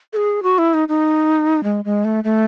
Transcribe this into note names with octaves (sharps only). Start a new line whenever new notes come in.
A4
G#4
F#4
E4
D#4
D#4
G#3
G#3
A3
A3